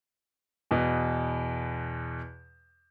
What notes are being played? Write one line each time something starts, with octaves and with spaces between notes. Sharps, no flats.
E2 B2